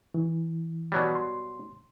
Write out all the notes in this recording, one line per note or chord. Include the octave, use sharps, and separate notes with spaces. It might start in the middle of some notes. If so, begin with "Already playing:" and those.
E3
B2 F#3 G3
C6